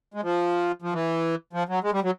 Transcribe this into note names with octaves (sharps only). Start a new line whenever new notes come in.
G#3
F3
F3
E3
F3
F#3
G#3
G3
F#3